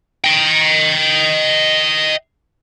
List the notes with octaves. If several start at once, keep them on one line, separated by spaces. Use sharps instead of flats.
D#5 G5